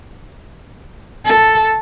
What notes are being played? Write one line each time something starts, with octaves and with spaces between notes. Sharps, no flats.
A4